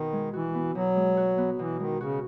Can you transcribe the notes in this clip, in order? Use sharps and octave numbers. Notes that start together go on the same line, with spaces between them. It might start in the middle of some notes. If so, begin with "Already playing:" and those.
Already playing: B2 D#3
G#3
E3 F#4
B3
B2 F#3
G#3
F#4
B3
B2 E3
D#3 G#3
C#3 F#4